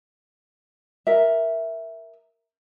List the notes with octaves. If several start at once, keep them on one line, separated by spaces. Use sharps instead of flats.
A#4 E5